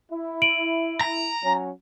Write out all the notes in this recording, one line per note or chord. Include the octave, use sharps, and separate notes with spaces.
E4
D7 D#7 F#7
A#5
F#3 C#4